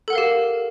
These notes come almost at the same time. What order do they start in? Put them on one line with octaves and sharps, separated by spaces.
A4 F#5 A#4 F5 G4